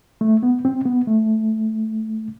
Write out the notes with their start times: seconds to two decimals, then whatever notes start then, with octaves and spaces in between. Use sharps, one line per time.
0.21 A3
0.43 B3
0.65 C4
0.85 B3
1.07 A3